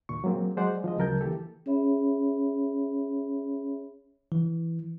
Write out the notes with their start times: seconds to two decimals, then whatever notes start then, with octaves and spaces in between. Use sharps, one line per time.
0.09 D#2 A#2 C#6
0.24 F#3 G#3 A#3 C4
0.57 F#3 G#3 C5 D5 F#5
0.84 F3 G#3 D#5
0.98 D2 C#3 F#3 A#4 A5 G6
1.21 E3 A#3 G4 A4
1.66 C#4 G#4 C#5 E5 B5
4.32 E3